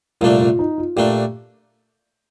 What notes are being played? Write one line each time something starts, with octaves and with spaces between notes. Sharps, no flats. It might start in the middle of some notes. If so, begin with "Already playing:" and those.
C2 A#2 A3 D4 F4
F4
D#4
F4
A#2 A3 D4 G4